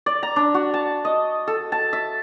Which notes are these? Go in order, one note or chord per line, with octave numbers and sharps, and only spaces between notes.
D5
A#5
D4
F#4
A5
D#5
A4
A5
E5